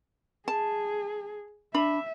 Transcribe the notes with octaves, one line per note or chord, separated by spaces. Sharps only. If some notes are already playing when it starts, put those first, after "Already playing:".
G#4 A5
D4 E5 B5